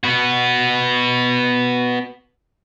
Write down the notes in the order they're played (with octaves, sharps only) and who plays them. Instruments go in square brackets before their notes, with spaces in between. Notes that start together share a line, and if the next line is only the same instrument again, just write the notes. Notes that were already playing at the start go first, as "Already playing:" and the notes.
[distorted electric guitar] B3 F#4